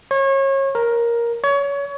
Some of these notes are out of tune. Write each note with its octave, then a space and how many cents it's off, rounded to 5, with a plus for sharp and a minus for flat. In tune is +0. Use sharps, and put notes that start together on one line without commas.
C#5 -30
A#4 +10
C#5 +25